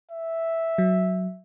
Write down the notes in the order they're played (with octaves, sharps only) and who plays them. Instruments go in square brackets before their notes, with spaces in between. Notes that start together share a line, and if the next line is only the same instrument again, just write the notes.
[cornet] E5
[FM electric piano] F#3